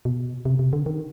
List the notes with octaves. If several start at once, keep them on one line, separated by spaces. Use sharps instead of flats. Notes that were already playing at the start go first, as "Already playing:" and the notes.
B2
C3
C3
D3
D#3